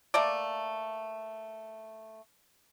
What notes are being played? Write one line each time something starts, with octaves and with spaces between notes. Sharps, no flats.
A3 A#3 D5